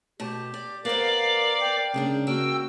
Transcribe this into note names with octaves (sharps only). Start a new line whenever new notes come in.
B2 A3 G4 A5
D5
B3 A#4 C5 D5 F5 D6
G5
C#3 G#3 A#3 D4
A#3 F#4 G5 E6